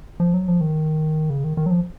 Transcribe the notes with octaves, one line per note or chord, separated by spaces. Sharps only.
F3
F#3
F3
D#3
C#3
D#3
D#3
F#3
F3